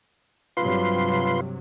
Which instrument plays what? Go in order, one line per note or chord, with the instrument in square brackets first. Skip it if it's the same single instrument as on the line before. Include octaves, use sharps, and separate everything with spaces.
[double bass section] G2 C3 F#3 [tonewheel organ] F4 B4 C6